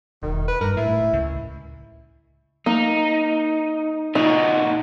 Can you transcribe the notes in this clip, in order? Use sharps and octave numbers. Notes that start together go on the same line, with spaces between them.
E1 D#3
B4
G2 A#4
A2 E4
C#2
A#3 D#4
A#2 D#4 F#4